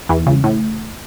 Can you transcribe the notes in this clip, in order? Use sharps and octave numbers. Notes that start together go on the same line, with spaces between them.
E2 E3
C#2 C#3
A2